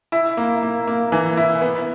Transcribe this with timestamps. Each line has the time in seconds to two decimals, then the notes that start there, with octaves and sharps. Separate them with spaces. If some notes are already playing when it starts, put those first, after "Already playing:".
0.12 E4
0.37 A#3
0.63 A#3
0.87 A#3
1.12 E3
1.37 E4
1.62 B3